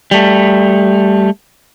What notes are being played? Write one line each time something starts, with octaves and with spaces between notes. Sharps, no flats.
G3 A3